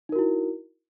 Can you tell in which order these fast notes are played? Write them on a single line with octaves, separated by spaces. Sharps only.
D#4 A#4 F#4 E4